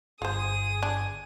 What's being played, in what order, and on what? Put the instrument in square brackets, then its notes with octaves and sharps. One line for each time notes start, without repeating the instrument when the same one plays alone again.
[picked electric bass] G1 [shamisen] F4 C5 [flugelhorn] G#4 [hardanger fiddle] D#6
[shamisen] D4 [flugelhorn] G#5